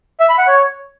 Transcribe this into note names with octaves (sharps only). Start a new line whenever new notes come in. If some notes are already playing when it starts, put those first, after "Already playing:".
E5
B5
F#5
C#5